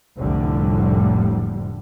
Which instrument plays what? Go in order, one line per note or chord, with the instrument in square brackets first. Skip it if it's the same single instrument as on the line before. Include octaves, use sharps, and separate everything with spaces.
[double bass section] F1 C2 A2 D3 G3